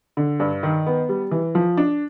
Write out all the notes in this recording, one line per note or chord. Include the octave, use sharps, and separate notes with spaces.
D3
G2
D#3
B3
G3
E3
F3
D4